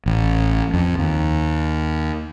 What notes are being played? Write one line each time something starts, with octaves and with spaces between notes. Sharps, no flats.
A1
F2
D#2